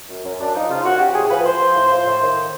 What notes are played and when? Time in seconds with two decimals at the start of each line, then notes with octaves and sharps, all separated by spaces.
0.09 F#2
0.24 F#2
0.39 F#2 D4
0.55 F3 D#4
0.69 C#3 F4
0.84 F#2 F#4
0.99 F3 G4
1.14 A2 G#4
1.30 F3 B4
1.45 F3 C5
1.60 F3
1.75 A2
1.91 F3
2.06 A2
2.21 D#3